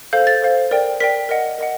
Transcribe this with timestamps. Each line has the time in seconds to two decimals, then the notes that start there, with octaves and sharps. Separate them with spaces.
0.13 A4 C5 F5 G6
0.27 A6
0.42 A4 C5 F5
0.71 A#4 D5 G5
1.00 A#4 D5 G5 B6
1.29 A#4 D#5 F#5
1.58 A#4 D#5 F#5